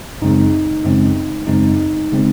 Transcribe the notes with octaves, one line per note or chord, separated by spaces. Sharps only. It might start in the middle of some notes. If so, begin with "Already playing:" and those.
F#2 C#3 G#3 C4 D#4
F#2 C#3 G#3 C4
F#2 C#3 G#3 C4 D#4
C#3 G#3 C4